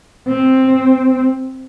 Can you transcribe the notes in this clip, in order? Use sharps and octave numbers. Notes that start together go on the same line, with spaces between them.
C4